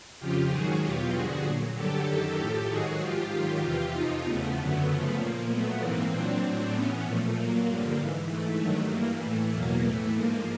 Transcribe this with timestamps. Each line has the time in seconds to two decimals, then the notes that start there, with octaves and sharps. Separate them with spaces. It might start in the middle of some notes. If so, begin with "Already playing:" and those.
0.19 F2 C#3 F3 F4 G4
0.50 G#2 D#3 F#3 F#4 G#4
0.82 E2 B2 F#3 F4 G4
1.13 G2 D3 F3 F#4 G#4
1.44 A#2 F#3
1.75 G2 D3 F#3 G4 A4
2.07 F#2 D#3 F#3 G4 A4
2.38 A2 F3
2.69 G#2 D#3 F#3 F#4 G#4
3.00 G#2 F3 F4 G4
3.31 G#2 D#3 F#3
3.63 E2 C3 E3
3.93 F2 C3 F3 D#4 F4
4.24 E2 C#3 F3 A3 B3
4.55 F#2 D3 F#3
4.86 F#2 C#3 F3 A3 B3
5.17 A#2 F3 A#3
5.48 A#2 F#3 A3 B3
5.79 G#2 E3 A#3 C4
6.11 A#2 F#3 C4 D4
6.42 A2 F#3
6.73 A2 E3 B3 C#4
7.04 A#2 F3 A3
7.35 A#2 F#3 A#3
7.66 G2 D3 F3
7.98 G#2 E3
8.29 G#2 E3 A3
8.60 G2 D#3 F#3
8.91 G2 E3 A#3
9.22 A2 E3 A3
9.53 E2 B2 F#3 A#3
9.84 A2 E3 A3
10.15 G#2 F3 A#3